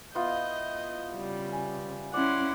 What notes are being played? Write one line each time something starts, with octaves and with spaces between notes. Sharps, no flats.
B3 E4 F4 D#5 G6
C#3 G3
G#5
C#4 E4 D5 F#5 C6 D6